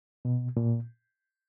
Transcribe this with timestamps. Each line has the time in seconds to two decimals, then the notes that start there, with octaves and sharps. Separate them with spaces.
0.25 B2
0.57 A#2